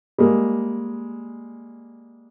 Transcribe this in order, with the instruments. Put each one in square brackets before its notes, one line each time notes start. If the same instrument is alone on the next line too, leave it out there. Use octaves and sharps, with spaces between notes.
[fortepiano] G3 G#3 A#3